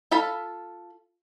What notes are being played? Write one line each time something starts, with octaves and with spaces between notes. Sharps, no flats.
F4 A4 F5 B5